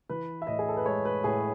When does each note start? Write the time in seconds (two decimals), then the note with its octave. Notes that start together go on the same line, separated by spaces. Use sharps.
0.09 E3 B4
0.42 E5
0.47 A2 D#5
0.59 G#4
0.69 A4
0.77 B4
0.86 G#3 C#5
1.05 B4
1.24 A2 G#4